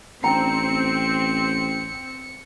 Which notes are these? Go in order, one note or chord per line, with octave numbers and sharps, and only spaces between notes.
A1 C4 D4 G5 A#5 C#7